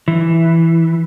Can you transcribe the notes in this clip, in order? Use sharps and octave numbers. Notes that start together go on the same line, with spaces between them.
E3